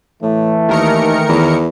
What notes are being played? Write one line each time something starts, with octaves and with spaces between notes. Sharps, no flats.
A2 E3 A3
D#2 D#3 A#4 C#7
E2